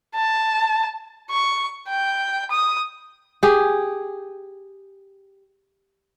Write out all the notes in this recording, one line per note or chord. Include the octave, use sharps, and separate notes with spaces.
A5
C#6
G5
D#6
G4 G#4